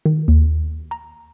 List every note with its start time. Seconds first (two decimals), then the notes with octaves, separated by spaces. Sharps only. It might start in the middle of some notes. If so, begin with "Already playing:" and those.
0.06 D#3
0.28 D#2
0.91 A#5